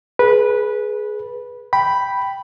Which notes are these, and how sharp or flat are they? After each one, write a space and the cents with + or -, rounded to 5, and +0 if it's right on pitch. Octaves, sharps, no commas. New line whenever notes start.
G#4 +20 B4 -15
G5 +0 B5 +0